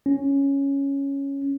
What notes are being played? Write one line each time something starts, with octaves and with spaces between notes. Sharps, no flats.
C#4